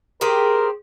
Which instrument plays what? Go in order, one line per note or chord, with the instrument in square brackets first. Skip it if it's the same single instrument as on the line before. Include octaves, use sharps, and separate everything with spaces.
[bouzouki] G4 G#4 C5 [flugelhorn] A#4